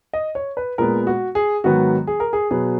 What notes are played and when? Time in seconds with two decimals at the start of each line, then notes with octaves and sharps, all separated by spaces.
0.13 D#5
0.35 C#5
0.57 B4
0.78 A#2 G#3 B3 A#4
1.07 F#4
1.35 G#4
1.64 G#2 D#3 F#3 B3 F#4
2.07 G#4
2.20 A#4
2.33 G#4
2.51 B2 F#3 B3 G#4